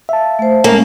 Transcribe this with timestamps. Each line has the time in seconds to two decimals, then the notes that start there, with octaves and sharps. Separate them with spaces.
0.09 E5 F5 A5
0.39 A3 C5
0.64 G#3 A#3 C#4